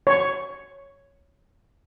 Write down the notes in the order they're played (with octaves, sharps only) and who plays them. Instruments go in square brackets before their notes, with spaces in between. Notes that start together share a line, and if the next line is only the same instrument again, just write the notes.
[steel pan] C#5 C#6